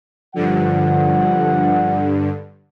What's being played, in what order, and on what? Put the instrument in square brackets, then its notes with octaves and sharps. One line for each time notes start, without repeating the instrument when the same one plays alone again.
[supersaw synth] G2 D3 [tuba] F3 [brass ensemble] F#5